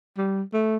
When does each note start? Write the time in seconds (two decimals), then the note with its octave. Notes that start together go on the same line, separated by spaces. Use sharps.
0.18 G3
0.53 A3